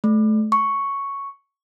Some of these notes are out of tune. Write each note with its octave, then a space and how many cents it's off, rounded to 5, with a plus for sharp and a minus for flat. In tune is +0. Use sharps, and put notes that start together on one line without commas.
A3 -30
C#6 +0